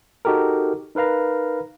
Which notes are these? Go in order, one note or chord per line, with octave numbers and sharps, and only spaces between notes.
D#4 F#4 G4 A4 A#4
D#4 A#4 B4 F5 A#5